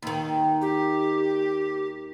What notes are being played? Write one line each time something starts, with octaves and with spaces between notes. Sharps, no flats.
D#2 D#3
G4